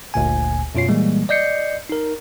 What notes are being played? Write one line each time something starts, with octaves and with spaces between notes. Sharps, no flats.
G1 D2 A#2 G#5
F#2 B2 F4 C#5 C7
A#2 E3 G3 G#3 A#3
D5 D#5 G6 C7 C#7
D#4 A#4